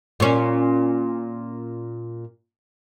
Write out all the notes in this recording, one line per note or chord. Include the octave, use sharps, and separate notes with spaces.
A#2 C#4